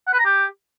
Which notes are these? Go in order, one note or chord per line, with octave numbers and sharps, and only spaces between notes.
F#5
B4
A#5
G4